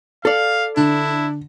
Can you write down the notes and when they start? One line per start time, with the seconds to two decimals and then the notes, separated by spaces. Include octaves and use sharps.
0.25 A4 D5 F5
0.77 D3 D4 E4